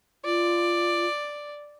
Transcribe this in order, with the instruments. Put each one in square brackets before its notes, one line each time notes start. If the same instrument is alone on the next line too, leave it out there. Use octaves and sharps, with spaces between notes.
[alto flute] F4 [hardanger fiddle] D5